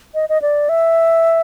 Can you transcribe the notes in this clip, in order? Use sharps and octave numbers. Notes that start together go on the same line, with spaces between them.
D#5
D#5
D5
E5